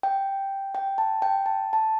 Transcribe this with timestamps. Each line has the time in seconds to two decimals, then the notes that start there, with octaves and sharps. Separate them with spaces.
0.03 G5
0.75 G5
0.98 A5
1.22 G5
1.46 A5
1.73 A5